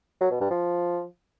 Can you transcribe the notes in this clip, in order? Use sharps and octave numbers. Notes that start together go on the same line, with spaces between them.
F#3
B2
G2
F3